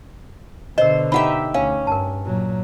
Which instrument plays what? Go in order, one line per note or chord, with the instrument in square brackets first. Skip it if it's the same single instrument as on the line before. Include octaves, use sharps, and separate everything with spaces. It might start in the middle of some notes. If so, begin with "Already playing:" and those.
[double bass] B2 D3 [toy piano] A#4 D#5 [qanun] C5
[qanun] D#4 G4 E5 [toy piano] F#5 B5
[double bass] D2 [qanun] C#4 [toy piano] F5
[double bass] G2 [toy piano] A#4 A5
[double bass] A#2 F#3